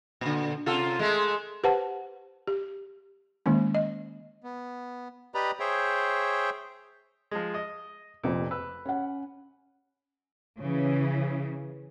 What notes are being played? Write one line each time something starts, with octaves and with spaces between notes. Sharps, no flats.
A#2 D3
C3 F4 A4
G#3 A3
G4 B4 C5 F#5 A5
G4
D#3 G#3 A#3 C#4
D#5
B3
G4 B4 D5 D#5 A#5 B5
G#4 C5 C#5 E5 G5
F3 G#3
D#5
F1 F2 A#2
B4 E6
C#4 F#5
C#3 E3